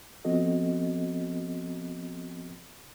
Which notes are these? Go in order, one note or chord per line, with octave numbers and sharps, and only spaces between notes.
F3 B3 C4 F#4 A4 D#5